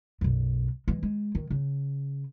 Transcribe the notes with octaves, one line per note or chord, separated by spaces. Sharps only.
B1 F#2
E3 G#3
G#3
D#3
C#3